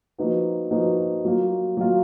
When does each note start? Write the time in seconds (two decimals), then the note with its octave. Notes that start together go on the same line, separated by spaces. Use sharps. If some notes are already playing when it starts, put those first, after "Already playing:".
0.18 F3 A#3 D#4 F#4 B4
0.71 F3 A#3 D#4 F#4 B4
1.25 F#3 A#3 F4
1.77 F#3 A#3 F4